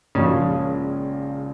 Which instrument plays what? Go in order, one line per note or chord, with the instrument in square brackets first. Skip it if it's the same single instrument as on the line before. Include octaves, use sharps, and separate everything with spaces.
[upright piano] A#1 A#2 F3 G#3 [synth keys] C#3